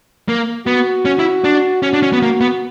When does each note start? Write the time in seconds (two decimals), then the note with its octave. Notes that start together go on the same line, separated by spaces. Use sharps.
0.28 A#3
0.67 B3 F#4
1.05 C#4
1.19 E4
1.44 D4
1.83 C#4 F#4
1.93 D4
2.02 C#4
2.13 B3
2.22 A#3
2.41 B3